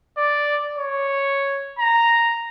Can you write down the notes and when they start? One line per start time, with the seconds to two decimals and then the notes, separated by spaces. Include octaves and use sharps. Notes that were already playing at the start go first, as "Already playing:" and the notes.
0.17 D5
0.78 C#5
1.79 A#5